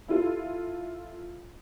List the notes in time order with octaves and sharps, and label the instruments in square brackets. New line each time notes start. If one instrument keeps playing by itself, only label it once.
[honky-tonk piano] E4 F4 A4